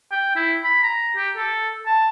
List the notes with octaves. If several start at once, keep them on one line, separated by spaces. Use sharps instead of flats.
G5
E4
B5
A#5
G4
A4
A5